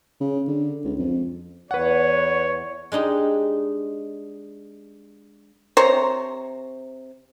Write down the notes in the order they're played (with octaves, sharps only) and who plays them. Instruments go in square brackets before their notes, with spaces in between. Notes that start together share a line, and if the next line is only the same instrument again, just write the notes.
[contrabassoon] C#3
D3
C#2
F2
[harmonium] E2 [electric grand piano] B4 F#5 [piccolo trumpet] C#5
[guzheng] G#3 D4 D#4 G4
[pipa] C3 C5 C#5 A#5